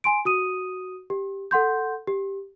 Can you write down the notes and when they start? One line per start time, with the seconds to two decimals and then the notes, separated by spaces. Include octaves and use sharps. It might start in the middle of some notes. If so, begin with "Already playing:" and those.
0.04 G#5 C6 D7
0.25 F#4 D#6 D#7
1.10 G4
1.51 A4 F#5 C6 G6
2.07 G4